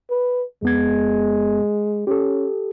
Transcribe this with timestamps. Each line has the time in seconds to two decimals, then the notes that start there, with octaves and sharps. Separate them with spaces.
0.11 B4
0.63 F2 G#3 B3 G#6
2.07 C#4 G4 A4